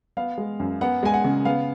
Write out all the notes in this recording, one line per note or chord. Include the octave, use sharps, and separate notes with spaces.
B3 F5
G#3
F#2
B3 F#5
G#3 G#5
F#5
C#3
B3 F5